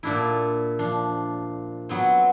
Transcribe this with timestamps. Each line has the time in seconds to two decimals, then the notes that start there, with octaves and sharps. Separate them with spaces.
0.03 A#2 D4 E4
0.79 F3 D4
1.89 F#3 B3 C4